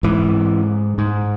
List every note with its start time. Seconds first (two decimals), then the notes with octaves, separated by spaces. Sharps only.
0.03 G#2 E3
0.98 G#2